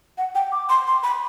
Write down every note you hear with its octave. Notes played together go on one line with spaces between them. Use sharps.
F#5
G5
D6
C6
C6
B5